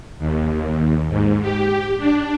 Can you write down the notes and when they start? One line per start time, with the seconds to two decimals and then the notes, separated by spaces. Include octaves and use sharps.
0.19 D#2
1.09 G#2
1.41 G4
1.98 D4